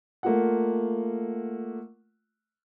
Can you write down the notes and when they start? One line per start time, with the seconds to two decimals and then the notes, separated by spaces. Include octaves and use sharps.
0.23 A3 A#3 F4 F#5